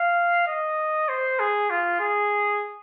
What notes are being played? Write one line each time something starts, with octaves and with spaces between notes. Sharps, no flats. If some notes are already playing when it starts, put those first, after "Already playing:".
Already playing: F5
D#5
C5
G#4
F4
G#4